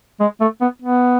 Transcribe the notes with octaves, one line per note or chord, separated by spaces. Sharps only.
G#3
A3
B3
B3